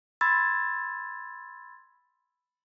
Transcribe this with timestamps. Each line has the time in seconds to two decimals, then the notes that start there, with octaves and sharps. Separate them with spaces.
0.21 B5 C6 E6 G#6 A6